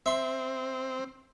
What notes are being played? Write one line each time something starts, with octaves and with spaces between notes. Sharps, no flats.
C4 E5 C6